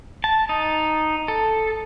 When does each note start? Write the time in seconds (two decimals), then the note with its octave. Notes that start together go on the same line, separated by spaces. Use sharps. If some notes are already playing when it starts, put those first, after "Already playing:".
0.24 A5
0.49 D#4
1.28 A4